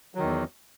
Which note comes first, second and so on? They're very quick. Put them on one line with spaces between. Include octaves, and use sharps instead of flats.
F#3 D#3 E2